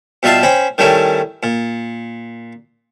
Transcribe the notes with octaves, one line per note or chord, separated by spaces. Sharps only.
B2 G3 F4 E5 A5 C6
C#4 C5 G5 B5
D#3 G3 A3 C#4 E4
A#2